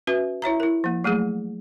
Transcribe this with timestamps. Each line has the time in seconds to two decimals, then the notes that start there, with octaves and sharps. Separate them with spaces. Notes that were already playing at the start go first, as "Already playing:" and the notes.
0.07 C#4 F#4 B4 E5
0.42 E4 C#5 E5 A#5
0.60 E4 A#4
0.84 F3 A#3
1.04 F#3 A3 A#3 G#4